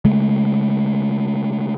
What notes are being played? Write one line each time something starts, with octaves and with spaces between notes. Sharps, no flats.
C#3 G#3 A3